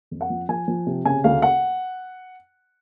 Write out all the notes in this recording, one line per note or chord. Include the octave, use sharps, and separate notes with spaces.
F2
F#5
F3
F3 G#5
F3
C3
C#3 G#5
D2 F5
F#5